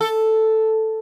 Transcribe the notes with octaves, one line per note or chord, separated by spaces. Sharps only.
A4